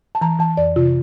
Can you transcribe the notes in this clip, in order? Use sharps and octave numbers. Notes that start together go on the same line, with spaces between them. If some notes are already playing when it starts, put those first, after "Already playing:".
A5
E3 A#5
E3 A5
F2 D5
C3 F4